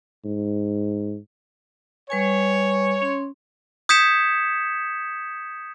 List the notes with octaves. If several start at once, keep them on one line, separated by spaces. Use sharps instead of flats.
G#2
G3 B4 C#5 G#5
C#4 C6
D#6 G6 G#6 B6 C#7 E7